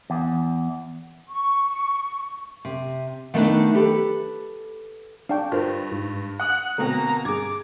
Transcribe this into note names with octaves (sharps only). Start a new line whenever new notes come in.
E2
C#6
C3
D#3 A3 B3 C4 D4 D#4
G4 A4 B4
D4 D5 F5 G5 A5 C#6
G2 F4 A#4 C5
G#2
F#5 D#6 F#6
B2 D3 A#3 C4 A#5
G2 G#4 D6 G#6